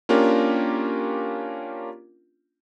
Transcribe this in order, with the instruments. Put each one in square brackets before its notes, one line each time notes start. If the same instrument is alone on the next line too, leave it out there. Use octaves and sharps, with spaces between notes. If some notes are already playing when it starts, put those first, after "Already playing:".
[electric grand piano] A#3 C#4 D4 F4 G4 A#4